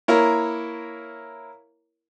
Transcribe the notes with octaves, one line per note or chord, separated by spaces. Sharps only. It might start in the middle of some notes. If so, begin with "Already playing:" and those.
A#3 E4 A#4 C#5 A#5